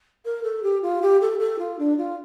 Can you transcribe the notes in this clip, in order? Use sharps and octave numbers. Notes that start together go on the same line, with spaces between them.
A#4
A4
G4
F4
G4
A4
A4
F4
D4
F4